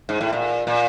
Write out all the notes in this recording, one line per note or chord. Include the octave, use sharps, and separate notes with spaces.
G#2
A2
A#2
A#2